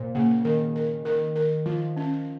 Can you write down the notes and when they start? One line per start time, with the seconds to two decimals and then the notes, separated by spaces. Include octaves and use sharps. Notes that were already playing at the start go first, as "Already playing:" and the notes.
Already playing: A#2 C5
0.15 C#3 A#3
0.44 D#3 A#4
0.76 A#4
1.05 D#3 A#4
1.36 A#4
1.66 F3 F4
1.97 C#4